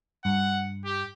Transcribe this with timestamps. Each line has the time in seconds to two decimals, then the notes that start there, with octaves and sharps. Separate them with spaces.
0.25 G2 F#5
0.85 G4